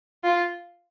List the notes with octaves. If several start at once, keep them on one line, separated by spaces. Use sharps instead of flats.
F4